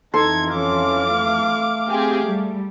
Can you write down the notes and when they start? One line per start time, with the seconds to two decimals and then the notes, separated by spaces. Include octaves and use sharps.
0.14 F2 E3 D#4 A4 C6 G#6
0.55 C#4 F5 D6
1.12 A3
1.88 C4 G4 G#4
2.24 G3